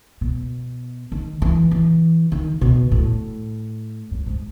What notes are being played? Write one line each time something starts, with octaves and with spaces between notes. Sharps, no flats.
B2
D#3
E3
E3
D#3
B2
A2
F#2
G#2